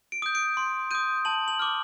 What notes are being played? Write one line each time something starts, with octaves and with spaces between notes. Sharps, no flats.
D7
D#6 G6
D7
C6
D#6 G6 D#7
A5 F#7
F#7
D6 F6